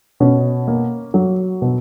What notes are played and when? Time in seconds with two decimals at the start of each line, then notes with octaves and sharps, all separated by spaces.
0.20 B2 C#4
0.68 A#3
1.14 F#3
1.62 B2